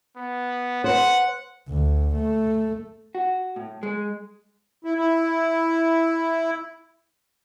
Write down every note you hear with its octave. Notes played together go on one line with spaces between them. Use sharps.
B3
C5 F#5
D2
A3
F#4
A2
G#3
E4
E4